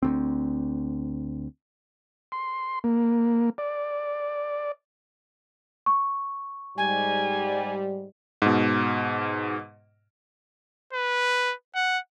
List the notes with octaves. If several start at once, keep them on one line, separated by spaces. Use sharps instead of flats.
D2 C4
C6
A#3
D5
C#6
G#2 G3 G#5
G#2 B2
B4
F#5